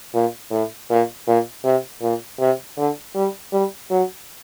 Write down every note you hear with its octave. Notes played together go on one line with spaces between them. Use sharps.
A#2
A2
A#2
A#2
C3
A#2
C3
D3
G3
G3
F#3